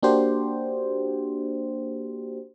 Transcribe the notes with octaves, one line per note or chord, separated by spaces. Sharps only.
A#3 D4 F#4 G4 C5